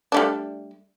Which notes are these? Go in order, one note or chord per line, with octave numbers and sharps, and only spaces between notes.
G3 A3 D4